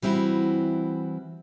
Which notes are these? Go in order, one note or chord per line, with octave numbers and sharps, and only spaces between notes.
E3 G3 C4 E4 F#4